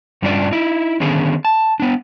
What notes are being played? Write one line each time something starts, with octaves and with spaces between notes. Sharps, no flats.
G2 G3 C#4 D4 F4 D5
D#4 E4
D3 D#3 B3 C#4 G#4
A5
B3 D4